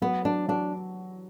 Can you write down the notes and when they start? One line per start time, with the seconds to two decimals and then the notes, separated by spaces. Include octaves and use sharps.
0.02 F#3 B3
0.25 F#3 D4
0.48 F#3 D4